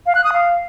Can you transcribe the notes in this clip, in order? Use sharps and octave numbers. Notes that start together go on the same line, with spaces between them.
F5
F#6
D#6
F5